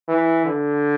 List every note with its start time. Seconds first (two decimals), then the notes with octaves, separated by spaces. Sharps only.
0.08 E3
0.46 D3